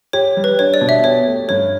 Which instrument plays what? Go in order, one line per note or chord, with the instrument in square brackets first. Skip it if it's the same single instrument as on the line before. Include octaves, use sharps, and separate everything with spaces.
[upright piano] G4 [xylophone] C#5
[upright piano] G3
[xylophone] B4
[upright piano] D4 [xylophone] C#5
[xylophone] D5
[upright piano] B2
[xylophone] E5
[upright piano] G4 [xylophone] C#5
[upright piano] A3
[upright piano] G2 [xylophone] C#5